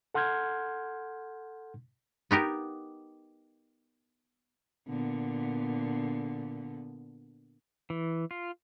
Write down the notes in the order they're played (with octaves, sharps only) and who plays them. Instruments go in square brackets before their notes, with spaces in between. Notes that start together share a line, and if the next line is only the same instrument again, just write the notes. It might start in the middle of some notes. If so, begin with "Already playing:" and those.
[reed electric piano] A4 F#5 C6 F6 G6 G#6
[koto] B3 D#4 G4 A#4
[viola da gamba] A#2 D3 B3
[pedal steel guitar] E3
F4